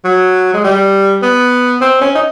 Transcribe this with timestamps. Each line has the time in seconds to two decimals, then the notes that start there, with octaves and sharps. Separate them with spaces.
0.04 F#3
0.54 G#3
0.64 G3
1.23 B3
1.81 C4
2.01 C#4
2.15 D#4